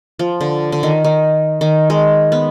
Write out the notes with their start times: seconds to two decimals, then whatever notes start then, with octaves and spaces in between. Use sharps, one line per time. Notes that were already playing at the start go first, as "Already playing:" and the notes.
0.19 F3
0.41 D3
0.72 D3
0.83 D#3
1.05 D#3
1.61 D#3
1.90 G#3
2.32 B3